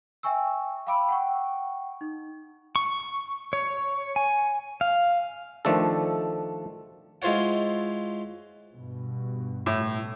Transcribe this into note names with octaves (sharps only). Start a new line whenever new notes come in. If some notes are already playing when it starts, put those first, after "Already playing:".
E5 G5 G#5 C#6 E6
F5 G5 B5 D6 E6 D7
F#5 G5 C#6
D#4
C#6
C#5
G#5
F5
D#3 F3 A3 D4 A4
G#3 E4 F4 C5 C#5 F#5
G2 B2
A2